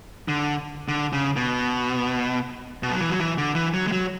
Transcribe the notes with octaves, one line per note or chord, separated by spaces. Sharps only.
D3
D3
C#3
B2
B2
F#3
E3
F#3
E3
D3
E3
F#3
G#3
F#3